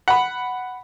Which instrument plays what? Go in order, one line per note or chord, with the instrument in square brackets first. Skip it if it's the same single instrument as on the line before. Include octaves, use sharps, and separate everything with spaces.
[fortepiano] F#5 B5